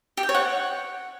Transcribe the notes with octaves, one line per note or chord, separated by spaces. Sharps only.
G4
G5
C#5
F#5